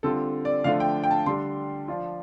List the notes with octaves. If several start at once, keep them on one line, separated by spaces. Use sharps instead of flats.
D3 G3 C4 F4 A4
D5
D3 F3 A3 D4 F4 F5
G5
G5
A5
D3 G3 D4 C6
F3 D4 F4